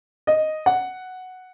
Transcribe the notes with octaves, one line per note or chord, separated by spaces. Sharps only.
D#5
F#5